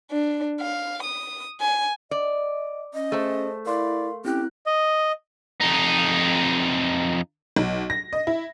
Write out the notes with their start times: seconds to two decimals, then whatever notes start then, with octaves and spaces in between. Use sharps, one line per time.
0.11 D4
0.60 F5
1.03 D#6
1.61 G#5
2.11 D5 D#5
2.94 C#4 D#5
3.12 A3 G#4 C5 A5
3.66 E4 A#4 D5 F5 C6
4.25 C4 C#4 E4 G4 F#6
4.66 D#5
5.61 F2 D#4
7.56 B1
7.90 A#6
8.13 D#5
8.27 E4